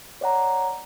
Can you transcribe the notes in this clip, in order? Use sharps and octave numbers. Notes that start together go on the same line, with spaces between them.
C#5 D5 F#5 A#5